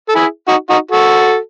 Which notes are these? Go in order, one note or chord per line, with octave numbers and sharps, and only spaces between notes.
A4
E4 G#4
D#4 F#4
D#4 F#4
F#4 A4